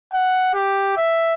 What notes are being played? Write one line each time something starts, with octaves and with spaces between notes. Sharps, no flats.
F#5
G4
E5